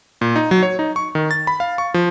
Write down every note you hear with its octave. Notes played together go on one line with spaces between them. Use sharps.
A#2
D#4
F#3
C#5
D#4
C#6
D#3
A6
B5
F5
C#6
F3